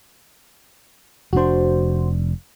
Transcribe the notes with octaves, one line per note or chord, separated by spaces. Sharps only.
F1 D4 F#4 C5